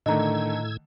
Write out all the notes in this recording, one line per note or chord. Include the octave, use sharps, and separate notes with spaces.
A2 D3 D#3 A3 D#5 A#5 E6 G#6